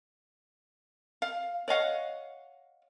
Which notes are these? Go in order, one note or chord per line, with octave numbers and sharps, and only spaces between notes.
F5
C#5 D#5 F5 F#5